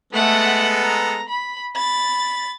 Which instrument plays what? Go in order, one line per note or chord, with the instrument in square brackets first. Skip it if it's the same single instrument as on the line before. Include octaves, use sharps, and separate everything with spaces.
[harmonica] G#3 B3 A4 [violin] A3 F#5
[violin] A#5
B5
[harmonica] B5 [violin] A6